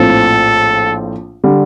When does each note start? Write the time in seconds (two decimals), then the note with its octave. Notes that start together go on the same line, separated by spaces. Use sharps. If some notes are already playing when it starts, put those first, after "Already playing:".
Already playing: A#1 A2 F3 C4 A4
1.44 D3 G3